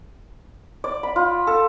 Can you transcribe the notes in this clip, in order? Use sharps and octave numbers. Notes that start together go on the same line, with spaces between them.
D5
B5
F4
A4